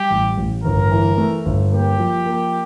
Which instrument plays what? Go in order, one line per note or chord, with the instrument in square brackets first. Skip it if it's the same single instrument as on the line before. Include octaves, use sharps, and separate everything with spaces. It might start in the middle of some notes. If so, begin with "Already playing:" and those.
Already playing: [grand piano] G3 [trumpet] G4
[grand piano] A1
A1
[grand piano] G1 [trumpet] A#4
[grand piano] E3
A3
G1
[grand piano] A#3 [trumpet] G4
[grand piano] F3
A#3